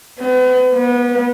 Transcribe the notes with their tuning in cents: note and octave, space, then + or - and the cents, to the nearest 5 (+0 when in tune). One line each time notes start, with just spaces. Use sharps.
B3 +40
B3 -25